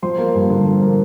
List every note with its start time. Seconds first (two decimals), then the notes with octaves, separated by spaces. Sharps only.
0.02 F3 C5 C6
0.18 A#3
0.35 G2
0.50 D3
0.66 F3
0.82 A#3